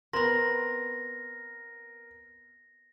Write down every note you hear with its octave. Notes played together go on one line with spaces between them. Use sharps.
B3 C4 A#4 B5 C6 A#6